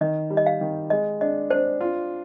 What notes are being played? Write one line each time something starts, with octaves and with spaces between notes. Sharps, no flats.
D#3 D#5
G3
D#5
F5
D#3
G#3 D#5
D4 D#5
D4 C5
F4